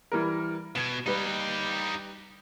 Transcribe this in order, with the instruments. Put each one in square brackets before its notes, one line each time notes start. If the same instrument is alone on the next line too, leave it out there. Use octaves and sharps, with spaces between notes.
[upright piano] E3 G3 A#4
[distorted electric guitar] B2 [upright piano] G#6 E7
[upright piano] G3 B4 [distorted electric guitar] D#4 G4